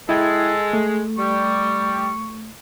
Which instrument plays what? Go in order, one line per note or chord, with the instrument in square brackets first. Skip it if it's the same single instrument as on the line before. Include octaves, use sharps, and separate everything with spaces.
[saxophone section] G#3 [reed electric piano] E4 G5 G#6 [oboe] A4
[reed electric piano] A3
[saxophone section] G3 [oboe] C#6